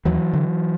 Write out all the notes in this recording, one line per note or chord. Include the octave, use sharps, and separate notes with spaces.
D#2 E3 F#3
D3